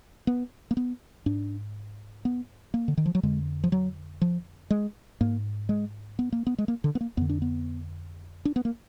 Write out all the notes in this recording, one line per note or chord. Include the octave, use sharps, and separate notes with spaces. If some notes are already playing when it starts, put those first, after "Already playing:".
B3
A#3
B3
G#2 D4
B3
A#3
D3
D#3
F3
F#3
F2 D3 G#3
F3
F#3
F3
G#3
G#2 A#3
G#3
B3
A#3
B3
G#3
A#3
D3
B3
A#3
F2 D3 B3
D4
B3
D4
B3
A#3